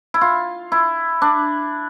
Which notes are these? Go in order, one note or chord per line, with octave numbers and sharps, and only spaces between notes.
E4
F4
E4
D4